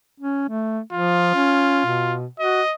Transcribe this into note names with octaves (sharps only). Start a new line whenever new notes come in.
C#4
A3
F3 F4
C#4
B2
F#4 D#5